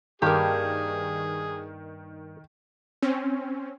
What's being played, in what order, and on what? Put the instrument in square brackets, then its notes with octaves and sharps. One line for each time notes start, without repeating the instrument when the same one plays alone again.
[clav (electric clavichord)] G2 A#3 B4 [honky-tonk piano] D#3 [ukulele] G4 A#4 [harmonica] G#4
[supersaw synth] C4 C#4